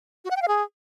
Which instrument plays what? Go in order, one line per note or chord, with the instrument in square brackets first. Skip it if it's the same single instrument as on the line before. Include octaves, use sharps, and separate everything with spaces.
[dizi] F#4
F#5
G5
F5
G#4